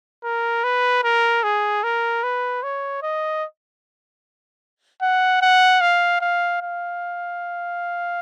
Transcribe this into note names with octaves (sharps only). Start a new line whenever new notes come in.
A#4
B4
A#4
G#4
A#4
B4
C#5
D#5
F#5
F#5
F5
F5
F5